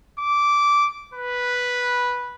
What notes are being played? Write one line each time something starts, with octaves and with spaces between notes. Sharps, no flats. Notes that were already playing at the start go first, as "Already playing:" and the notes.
D6
B4